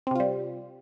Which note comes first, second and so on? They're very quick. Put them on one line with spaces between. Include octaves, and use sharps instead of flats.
C4 C3 F4 G3